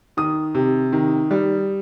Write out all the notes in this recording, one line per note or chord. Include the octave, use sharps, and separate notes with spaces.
D#3 D#6
C3
D#3
G3